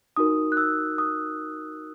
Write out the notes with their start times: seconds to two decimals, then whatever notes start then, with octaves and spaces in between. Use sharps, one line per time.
0.17 D#4 F#4 A#4 D#6
0.52 F#6
0.57 E6
0.98 D#6